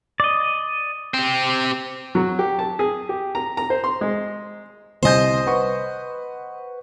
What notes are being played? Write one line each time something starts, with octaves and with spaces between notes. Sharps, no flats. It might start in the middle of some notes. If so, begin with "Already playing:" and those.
D5 D#5
C4 G4
F#3
G4
A5
G#4
G4
A#5
A#5
C5
C6
G#3
C2 C5 D#5 G#5 G6
B4 F#5 C#6